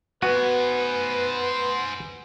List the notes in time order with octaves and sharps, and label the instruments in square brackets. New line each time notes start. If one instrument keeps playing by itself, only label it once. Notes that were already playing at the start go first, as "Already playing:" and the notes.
[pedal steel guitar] B3 [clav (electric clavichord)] F#4 [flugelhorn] B4 [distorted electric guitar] C5 G#5